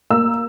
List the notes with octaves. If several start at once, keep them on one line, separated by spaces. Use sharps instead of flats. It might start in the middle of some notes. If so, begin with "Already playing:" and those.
A#3 E6